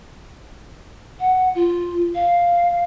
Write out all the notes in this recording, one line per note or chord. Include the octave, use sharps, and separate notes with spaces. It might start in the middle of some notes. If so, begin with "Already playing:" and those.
F#5
F4
F5